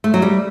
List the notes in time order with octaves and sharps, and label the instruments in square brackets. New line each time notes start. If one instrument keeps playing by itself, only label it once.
[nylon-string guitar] A3
F#3
G3